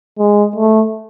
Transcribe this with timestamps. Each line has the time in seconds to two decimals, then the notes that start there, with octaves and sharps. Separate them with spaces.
0.19 G#3
0.56 A3